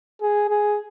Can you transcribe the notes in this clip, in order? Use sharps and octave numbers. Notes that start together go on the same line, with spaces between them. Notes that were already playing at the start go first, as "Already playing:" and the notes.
G#4
G#4